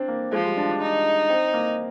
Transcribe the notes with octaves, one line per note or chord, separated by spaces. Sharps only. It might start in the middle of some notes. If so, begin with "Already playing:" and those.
Already playing: C4 D4
A#3
F3 G#3
G3
D4
D4
D#4
C4
A#3